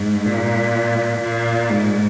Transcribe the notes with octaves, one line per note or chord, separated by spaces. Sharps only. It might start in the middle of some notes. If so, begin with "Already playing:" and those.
Already playing: G#2
A#2
A#2
G#2